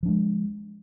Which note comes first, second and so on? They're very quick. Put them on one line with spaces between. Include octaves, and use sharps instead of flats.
F3 D4 G#3